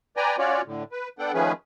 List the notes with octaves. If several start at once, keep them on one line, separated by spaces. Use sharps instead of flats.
B4 D5 G5 G#5 A#5
C#4 F4 F#4 C#5 D5
A2 D3
B4
B3 D4 A4 F#5 G5
D#3 F3 A3 C#4 G#4 B4